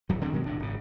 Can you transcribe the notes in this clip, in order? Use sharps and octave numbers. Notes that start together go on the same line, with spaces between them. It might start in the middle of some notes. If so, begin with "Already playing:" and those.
D1 A#1 E3 F#3
D3 C4 D4
B2 D#3 F#3 G#3
F1 A2 D4
G#1 C#3